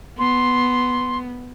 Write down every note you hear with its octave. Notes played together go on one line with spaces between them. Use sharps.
B3 C6